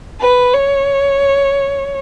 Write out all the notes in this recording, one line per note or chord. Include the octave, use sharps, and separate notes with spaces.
B4
C#5